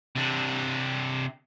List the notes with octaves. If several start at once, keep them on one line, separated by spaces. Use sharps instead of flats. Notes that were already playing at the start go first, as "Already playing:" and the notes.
C3 D4